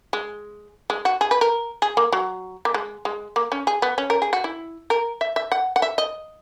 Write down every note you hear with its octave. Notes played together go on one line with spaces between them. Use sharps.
G#3
G#3
F#4
G#4
B4
A#4
G#4
A#3
F#3
A#3
G#3
G#3
A#3
C#4
G#4
B3
C#4
A#4
G#4
F#4
E4
A#4
E5
E5
F#5
F#5
E5
D#5